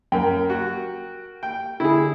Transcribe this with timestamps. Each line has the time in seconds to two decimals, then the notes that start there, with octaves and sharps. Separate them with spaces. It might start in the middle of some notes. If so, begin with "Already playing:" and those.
0.12 F#2 A#4 G5
0.50 F#4
1.43 G5
1.80 D3 E4 G#4